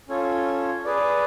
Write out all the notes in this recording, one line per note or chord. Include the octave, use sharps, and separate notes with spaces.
C#4 F4 A4 C#5
G#4 B4 D5